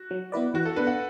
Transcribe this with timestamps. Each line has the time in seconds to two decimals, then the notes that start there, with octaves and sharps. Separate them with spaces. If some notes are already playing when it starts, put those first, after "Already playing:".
Already playing: F#4
0.11 F#3
0.32 B3 E4 B4 D5
0.54 E3 F#4
0.65 A4
0.76 B3 D4 B4
0.87 F#5